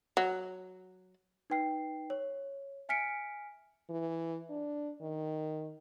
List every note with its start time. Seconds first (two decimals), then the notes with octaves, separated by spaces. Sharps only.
0.17 F#3
1.50 D#4 B4 G5 C7
2.10 C#5
2.89 E5 G#5 F6 B6 C#7 D7
3.90 E3
4.50 D4
5.02 D#3